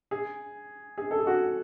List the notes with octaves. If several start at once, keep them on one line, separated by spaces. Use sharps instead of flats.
G#4
G#4
A4
G#4
F#4